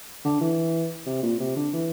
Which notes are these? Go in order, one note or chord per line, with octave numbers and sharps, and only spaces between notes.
D3
E3
C3
A#2
C3
D3
E3